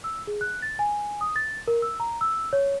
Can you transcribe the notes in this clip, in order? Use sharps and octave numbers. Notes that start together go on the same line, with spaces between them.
E6
G#4
F#6
A6
G#5
D#6
A6
A#4
E6
A#5
E6
C#5